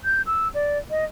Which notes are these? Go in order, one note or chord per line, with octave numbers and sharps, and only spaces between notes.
G6
E6
D5
D#5